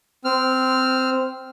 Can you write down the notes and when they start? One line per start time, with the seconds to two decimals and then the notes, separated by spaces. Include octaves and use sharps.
0.25 C4 F6